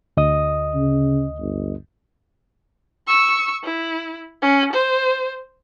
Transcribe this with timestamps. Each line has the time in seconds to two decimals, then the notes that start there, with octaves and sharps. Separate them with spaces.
0.17 D2 D#5 D#6
0.75 C#3
1.39 G1
3.07 C#6 E6
3.64 E4
4.42 C#4
4.73 C5